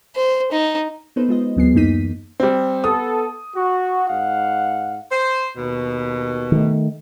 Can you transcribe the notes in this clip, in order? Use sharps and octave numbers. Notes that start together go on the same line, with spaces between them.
C5
D#4
B3 D#4 A4 B4 C5
G#3 F4 D#5
D2 F#3 B3 G#4 C7
F#2 E3 A#3 D#4 B6 D#7
G3 C4
B3 A4 D#6
F#4
G#2 F5 F#5
C5
D#2 B2
D#3 A3